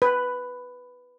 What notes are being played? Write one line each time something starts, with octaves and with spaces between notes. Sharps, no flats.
B4